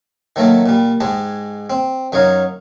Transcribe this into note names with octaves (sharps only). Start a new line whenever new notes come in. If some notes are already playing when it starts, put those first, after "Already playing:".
D#3 F#3 A3 A#3 A4
A#2 G3
G#2 G#3 G4 A5
C4
F#2 F#3 D#4 C#5 F5